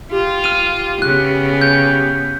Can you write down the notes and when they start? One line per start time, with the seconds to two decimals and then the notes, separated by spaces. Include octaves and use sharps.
0.12 F4 G4
0.44 F6 D#7
1.02 C#3 B3 F#6
1.61 G6